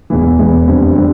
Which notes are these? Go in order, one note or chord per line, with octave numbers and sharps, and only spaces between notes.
E1 E2 E3
E1 E2 E3
F2 D3 G3 C4
D3 G3 C4